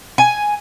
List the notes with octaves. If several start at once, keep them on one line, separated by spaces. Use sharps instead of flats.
G#5